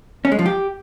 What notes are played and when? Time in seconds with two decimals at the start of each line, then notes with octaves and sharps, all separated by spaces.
0.25 C#4
0.32 G#3
0.39 F3
0.46 G4